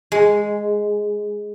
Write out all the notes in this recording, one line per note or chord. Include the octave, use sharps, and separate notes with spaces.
G#3